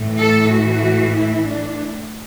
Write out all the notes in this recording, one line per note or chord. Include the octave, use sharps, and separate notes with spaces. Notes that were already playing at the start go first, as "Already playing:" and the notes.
Already playing: A2 E3 A3
A4
F#4
E4
D4